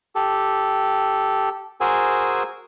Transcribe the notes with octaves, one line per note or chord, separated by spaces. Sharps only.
G4 A4
F#4 G#4 A#4 C5 G#5 E6